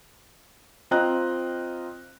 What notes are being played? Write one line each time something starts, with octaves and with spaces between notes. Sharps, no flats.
C4 F4 D#5 G5 A#5 F#6